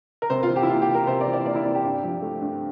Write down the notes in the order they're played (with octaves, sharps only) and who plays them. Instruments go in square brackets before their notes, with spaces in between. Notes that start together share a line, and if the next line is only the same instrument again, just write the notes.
[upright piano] A#4
C3 C5
F4
E3
G4
E4
A#3 F4
G4
C3
A#4
C3 C5
D5
E3
D5
A#3 D5
E4
C3
G4
G2
F3
A3
G2